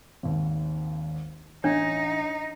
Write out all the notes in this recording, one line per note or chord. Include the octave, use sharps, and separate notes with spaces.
G#1 D#2
A1 D4 D#4 C#5